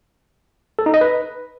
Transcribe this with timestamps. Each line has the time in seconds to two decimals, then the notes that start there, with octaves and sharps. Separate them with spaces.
0.79 A4
0.86 D#4
0.94 D#5
1.01 B4